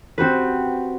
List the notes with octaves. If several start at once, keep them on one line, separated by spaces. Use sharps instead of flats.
C4 F#4 G4 B4